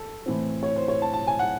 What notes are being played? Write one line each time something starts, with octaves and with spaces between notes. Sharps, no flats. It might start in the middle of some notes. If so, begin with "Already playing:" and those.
Already playing: A4
A2 E3 C4
C#5
C5
C#5
A5
A5
G#5
F#5